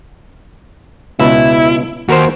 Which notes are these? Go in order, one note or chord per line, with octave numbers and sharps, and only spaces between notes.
C#2 B2 E4
D#2 F#4 A#4 C5